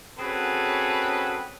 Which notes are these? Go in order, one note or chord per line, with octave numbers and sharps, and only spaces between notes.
C4 C#4 F#4 G#4 A4 B4